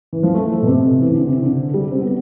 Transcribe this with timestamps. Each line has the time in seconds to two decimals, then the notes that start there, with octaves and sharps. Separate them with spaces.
0.13 E3
0.23 F3
0.34 A3
0.62 B2
0.67 C3
1.01 E3
1.14 D3
1.28 C3
1.43 D3
1.74 G3
1.91 C4
2.01 B3